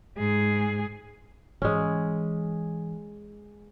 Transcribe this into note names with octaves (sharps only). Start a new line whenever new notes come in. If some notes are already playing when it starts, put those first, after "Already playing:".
G#2 G#4
G#2 E3 G#3 C#4